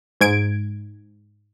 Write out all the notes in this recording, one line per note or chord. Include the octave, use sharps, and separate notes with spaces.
G#2 G#6 D7